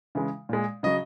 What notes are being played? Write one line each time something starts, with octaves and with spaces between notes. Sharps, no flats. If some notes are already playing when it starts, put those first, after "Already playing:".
C#3 E3 G#3
A#2 G#3
C#3 F#3 D#5